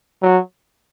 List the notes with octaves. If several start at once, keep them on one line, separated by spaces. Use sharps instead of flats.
F#3